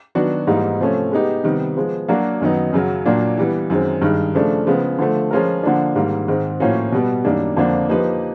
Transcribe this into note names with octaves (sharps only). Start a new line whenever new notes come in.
D#3 F#3 B3 D4 F#4
G#2 E3 G3 A#3 D#4
C3 F3 A3 C#4
G#3 B3 D#4 G4
C3 D#3 G3 B3
F3 G#3 B3
F#3 A#3 D4 F#4 A#4
F#2 D#3 F#3 B3 D#4
F#2 C#3 F#3
A#2 F#3 A#3 D4
E3 G3 B3
F#2 D#3 G#3 C4
G2 D#3 G#3
C#3 F3 A3 D4
C#3 F3 G#3 B3
D3 F3 A3
F3 G#3 C#4 F4 A#4
D3 F3 A#3 D4
G#2 D#3 G3 A#3
G#2 D#3 G#3 C4
A2 F3 A#3 C#4 F#4
B2 G3 B3
F#2 D#3 G3 A#3 D4
F2 D3 F3 A#3 D4
F3 A#3 D#4 G4 B4